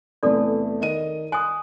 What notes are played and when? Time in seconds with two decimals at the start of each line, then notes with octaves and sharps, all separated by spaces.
0.23 E2 C3 A3 A4 D5
0.81 D#3 D#5 D#7
1.32 G#5 D#6 F#6